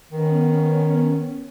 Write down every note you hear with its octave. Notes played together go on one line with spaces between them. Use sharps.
D#3 B3 C#4